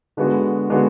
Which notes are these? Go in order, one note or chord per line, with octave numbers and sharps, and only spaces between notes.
D3 G#3 B3 F#4
D3 G#3 B3 F#4